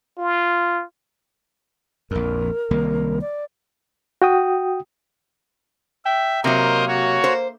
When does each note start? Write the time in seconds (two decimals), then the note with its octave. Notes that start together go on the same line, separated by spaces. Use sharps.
0.18 F4
2.11 A#1 F2 A#4
2.71 C2 D#3 A#3
3.21 D5
4.22 F#4 G5 D#6
6.05 E5 G5
6.44 C3 F#3 A#3 A#4 C5 D#5
6.88 F#4 C#5
7.24 C5